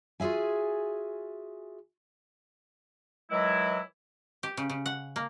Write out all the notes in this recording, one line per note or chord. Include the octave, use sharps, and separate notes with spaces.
F4 F#4 G#4 E5 G#5
D#3 E3 F#3 G#3 E4
G4
C#3
C#3
F#5
A#3